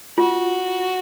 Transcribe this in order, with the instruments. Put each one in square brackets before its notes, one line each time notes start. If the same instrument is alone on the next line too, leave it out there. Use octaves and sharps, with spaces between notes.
[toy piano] F4 [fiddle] F#4